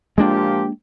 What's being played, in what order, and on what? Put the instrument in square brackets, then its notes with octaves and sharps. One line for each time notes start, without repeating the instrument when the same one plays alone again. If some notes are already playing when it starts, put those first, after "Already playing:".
[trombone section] A#2 F3 G4 [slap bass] G#3 A#3 D4